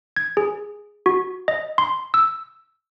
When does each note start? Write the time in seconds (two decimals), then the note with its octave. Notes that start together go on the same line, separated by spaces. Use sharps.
0.16 G#6
0.37 G#4
1.06 F#4
1.48 D#5
1.78 C6
2.14 E6